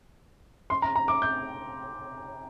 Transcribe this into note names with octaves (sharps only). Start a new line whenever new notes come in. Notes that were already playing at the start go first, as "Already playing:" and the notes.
C6
A#5
A#5
D6
G6